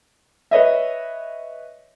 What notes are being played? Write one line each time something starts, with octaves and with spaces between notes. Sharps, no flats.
B4 C#5 D#5 E5